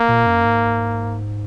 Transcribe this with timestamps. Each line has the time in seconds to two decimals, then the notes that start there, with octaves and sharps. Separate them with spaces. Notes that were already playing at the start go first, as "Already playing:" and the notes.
Already playing: A#3
0.08 A#2
0.26 F#2
0.45 G#2